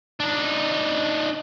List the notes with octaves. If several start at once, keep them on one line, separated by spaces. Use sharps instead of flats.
D4 D#4